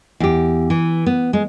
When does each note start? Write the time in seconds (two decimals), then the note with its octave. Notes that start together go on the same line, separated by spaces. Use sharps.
0.20 E2 G4
0.70 E3
1.06 B3
1.33 G#3